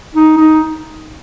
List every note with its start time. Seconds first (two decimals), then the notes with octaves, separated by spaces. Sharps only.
0.15 D#4
0.37 D#4